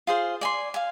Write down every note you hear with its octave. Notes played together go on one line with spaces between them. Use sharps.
F4 G#4 C5 F5
D5 G#5 C6
F5 G#5